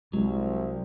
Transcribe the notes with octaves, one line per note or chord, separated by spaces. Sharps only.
C2 F#3 G#3